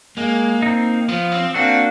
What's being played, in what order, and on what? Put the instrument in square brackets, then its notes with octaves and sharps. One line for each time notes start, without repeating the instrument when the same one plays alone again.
[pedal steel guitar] G#3 [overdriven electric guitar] A#3
[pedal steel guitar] C4 D#4
[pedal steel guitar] F3 [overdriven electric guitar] B3
[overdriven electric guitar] C4
[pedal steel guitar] A#3 D4 F#4 [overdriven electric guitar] C4